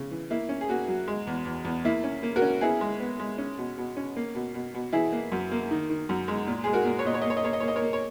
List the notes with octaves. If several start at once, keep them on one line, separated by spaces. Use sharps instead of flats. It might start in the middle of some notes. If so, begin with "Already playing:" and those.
Already playing: C#3
E3
A#3 E4
C#4
G#4
A#3 F#4
F#3
G#3
E2
E2
E2
A#3 E4
C#4
A#3
F#4 A#4
C#4
B3 E4 G#4
G#3
B3
G#3
C#4
B2
B2
C#4
A#3
B2
B2
B2
E3 E4 G#4
A#3
F#2
A#3
D#3
D#3
F#2
G#3
A#2
G#3 G#4
F#4 A#4
A#2
C#5
A#2 D#5
C#5
D#5
A#3
C#5
D#5
A#3 C#5
D#5
A#3 C#5
D#5
A#4 C#5
A#3
C#5